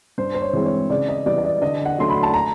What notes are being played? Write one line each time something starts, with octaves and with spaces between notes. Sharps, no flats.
G2 C5
C5
C#5
E3 G#3 C4
C#5
C#3 D5
D#5
E3 G3 B3 D5
D#5
D5
D3 D#5
F#5
F#3 A3 D4 C6
B5
A5
A#5